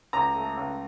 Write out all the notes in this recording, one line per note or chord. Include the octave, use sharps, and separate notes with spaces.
C#2 A#5
A3
C#2